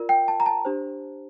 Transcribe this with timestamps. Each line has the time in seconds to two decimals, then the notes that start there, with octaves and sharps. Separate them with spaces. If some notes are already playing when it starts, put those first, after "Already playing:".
Already playing: F4 A#4 D5
0.09 G5
0.28 A5
0.40 A#5
0.46 A5
0.65 D4 G4 C5